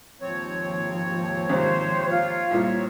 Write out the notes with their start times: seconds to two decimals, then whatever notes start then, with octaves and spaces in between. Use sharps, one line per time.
0.21 D#2 G#2 F3 C4 C#5
1.49 G#1 C3 C5
2.10 F4
2.51 C2 A#2 A#3